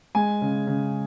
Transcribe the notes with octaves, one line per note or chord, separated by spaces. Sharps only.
G#3 G#5
C#3
C#3